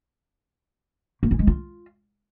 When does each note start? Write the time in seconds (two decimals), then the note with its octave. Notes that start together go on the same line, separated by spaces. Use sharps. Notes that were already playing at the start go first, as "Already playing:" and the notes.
1.23 A#3
1.31 E4
1.39 G#3
1.47 F4